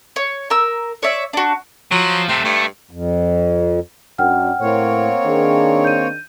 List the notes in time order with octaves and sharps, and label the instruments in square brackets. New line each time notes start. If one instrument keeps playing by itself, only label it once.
[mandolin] C#5
A#4 E6
C#5 D5 E5
D4 F#4
[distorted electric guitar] F3 F4 [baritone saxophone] F#3
[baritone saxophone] C3 [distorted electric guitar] A3 C4
[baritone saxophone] G2 [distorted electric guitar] A3
[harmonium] F2
[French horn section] F#2 D4 [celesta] F#5 G5 F6
[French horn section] A2 [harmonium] A#3 C4 C#5
[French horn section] D#3 D4 G#4
[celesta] G6 D#7